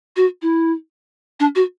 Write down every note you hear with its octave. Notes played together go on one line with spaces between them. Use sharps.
F#4
E4
D4
F#4